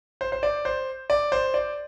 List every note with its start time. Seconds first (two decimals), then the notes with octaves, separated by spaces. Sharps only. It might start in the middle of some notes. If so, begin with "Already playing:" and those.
0.21 C5
0.32 C5
0.43 D5
0.65 C5
1.10 D5
1.32 C5
1.54 D5